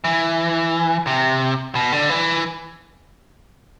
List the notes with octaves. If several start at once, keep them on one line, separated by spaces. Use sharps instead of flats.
E3
C3
B2
D3
E3